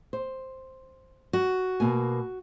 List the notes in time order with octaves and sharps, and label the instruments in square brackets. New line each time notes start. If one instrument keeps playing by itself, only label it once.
[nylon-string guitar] C5
[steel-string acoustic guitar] F#4
[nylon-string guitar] B2 A#3 G#5